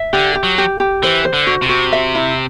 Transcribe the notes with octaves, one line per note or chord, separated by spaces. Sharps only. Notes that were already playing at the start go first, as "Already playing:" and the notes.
Already playing: E5
D3 G4
G4
F#3
G4
G4
E3 C5
C5
D3
F#4
C3
F#4
E5
E4